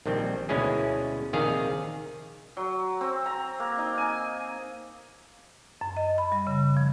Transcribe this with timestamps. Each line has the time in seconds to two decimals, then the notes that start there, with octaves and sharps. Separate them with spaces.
0.06 A#1 D#3 G3 C4
0.49 D2 B2 G#3 C#4 E4 G#4
1.33 A#1 C3 D#3 G#4 F5
2.57 F#3
3.01 C4
3.26 A#5
3.60 A#3
3.78 D#4
3.98 G#5
5.81 F#2
5.97 D#5
6.18 B5
6.32 G3
6.47 C#3
6.77 F3